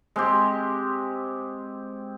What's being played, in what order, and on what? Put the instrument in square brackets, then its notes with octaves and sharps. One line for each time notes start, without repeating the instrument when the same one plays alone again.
[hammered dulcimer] G#3 C4 G4